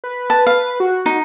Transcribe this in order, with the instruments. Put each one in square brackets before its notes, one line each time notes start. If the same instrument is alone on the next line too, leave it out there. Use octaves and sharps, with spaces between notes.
[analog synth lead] B4
[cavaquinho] A5
F5
[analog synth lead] F#4
[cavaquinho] D#4